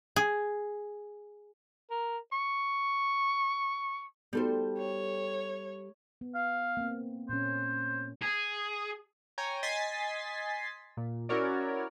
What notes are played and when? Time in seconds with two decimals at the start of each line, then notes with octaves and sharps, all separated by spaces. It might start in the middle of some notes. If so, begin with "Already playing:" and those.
0.16 G#4
1.90 A#4
2.32 C#6
4.33 G3 B3 D#4 F#4 A4 C5
4.78 C#5
6.21 B3
6.35 F5
6.77 A#3 C4
7.29 A#2 C#4 C5
8.22 G#4
9.38 C#5 G5 G#5 A#5
9.63 D#5 G#5 C6 A6 B6 C7
10.97 A#2
11.29 C#4 E4 F#4 A#4 C#5 D5